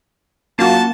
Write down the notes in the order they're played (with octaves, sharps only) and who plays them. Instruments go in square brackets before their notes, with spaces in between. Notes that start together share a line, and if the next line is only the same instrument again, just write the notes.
[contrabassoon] F#2 [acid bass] A#3 [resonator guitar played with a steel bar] F4 F#4 [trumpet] A5